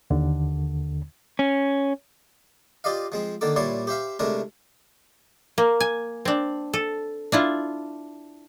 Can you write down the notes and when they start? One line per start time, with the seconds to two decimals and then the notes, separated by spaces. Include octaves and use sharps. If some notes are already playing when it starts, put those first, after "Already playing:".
0.10 D#2 D3
1.39 C#4
2.84 F4 G4 D5 D#5 F5
3.12 F3 G#3 C4
3.41 D3 D#3 A#3 A4 D6
3.56 A#2 G3 E4 C#5 D5 C6
3.87 G4 C5 E5 F5
4.19 C3 G#3 A3 D4 E4 A#4
5.58 A#3
5.80 G#5
6.25 C4 D4
6.73 A4
7.32 D4 E4 F4